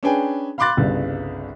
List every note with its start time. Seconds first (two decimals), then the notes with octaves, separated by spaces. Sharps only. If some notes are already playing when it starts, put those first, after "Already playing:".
0.03 C#4 D4 G#4 B4 G5 G#5
0.58 F5 B5 C6 D6 F#6 A6
0.77 G1 C2 C#3